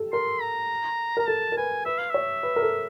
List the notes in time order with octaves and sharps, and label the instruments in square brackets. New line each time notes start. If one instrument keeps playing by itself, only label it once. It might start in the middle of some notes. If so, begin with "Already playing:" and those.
Already playing: [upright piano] G4 A4
[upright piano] A#4 [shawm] C6
[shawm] A#5
[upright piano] A#4 [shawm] A#5
[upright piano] A4 [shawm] A5
[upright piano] A#4
[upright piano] B4 [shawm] G#5
[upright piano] B4 [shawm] E5
[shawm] F5
[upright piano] C#5 [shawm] E5
[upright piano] B4
A#4
A4